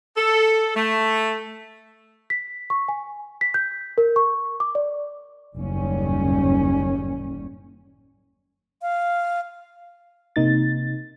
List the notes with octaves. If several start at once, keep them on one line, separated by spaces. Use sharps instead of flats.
A4
A3
B6
C#6
G#5
B6
G6
A#4
C#6
D6
D5
F#1 D#2 A2 G3 C#4
F5
C3 A#3 D#4 A6